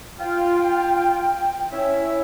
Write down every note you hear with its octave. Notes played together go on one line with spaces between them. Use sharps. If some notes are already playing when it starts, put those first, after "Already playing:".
F4 G5
C#4 E4 E5